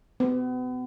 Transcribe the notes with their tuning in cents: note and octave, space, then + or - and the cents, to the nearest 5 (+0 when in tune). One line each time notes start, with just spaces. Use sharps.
B3 +35